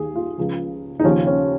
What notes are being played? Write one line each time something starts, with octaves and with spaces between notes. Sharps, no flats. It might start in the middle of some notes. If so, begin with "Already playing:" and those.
Already playing: D#2 D#3 G#4
F4
C#2 C#3 F3
D#4
D#2 C#3 F3 C#4
C#4